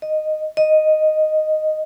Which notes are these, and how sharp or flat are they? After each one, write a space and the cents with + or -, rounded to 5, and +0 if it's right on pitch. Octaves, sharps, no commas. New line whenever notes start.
D#5 -10
D#5 -5